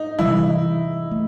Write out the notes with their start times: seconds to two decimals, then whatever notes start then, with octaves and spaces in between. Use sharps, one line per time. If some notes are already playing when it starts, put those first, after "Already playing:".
Already playing: D#4
0.19 C3 E3 G3 E4
1.11 A3